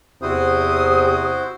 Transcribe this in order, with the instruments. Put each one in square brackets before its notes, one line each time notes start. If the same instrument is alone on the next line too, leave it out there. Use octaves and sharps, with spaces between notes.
[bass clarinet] E2 [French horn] C3 [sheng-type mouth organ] E4 F#4 C5 [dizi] D#6